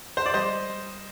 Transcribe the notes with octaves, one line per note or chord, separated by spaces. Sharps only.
C5
D5
G3 C5 D#5